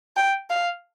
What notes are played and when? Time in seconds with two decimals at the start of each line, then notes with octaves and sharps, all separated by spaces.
0.16 G5
0.50 F5